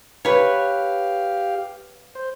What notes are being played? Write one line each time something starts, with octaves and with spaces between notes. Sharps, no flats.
G4 B4 C#5 F5
C5